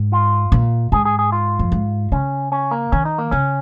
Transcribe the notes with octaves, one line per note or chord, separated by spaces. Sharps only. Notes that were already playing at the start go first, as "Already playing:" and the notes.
Already playing: G#2
F4
A#2
G#2 G#4
G#4
G#4
F4
F2
G#2
C#3 C#4
C#4
A#3
D#3 C#4
D#4
A#3
C#3 C#4